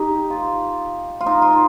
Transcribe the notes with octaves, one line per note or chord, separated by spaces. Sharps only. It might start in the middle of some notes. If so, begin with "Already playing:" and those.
Already playing: D#4 G4
F4
F4
D#4
F4